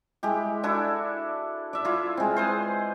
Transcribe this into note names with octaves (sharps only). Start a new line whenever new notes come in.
G#3 E4 G4
D4 E4 F#4 A4
D5 E5
E4 F4
G#3 C4
G#4 B4 C5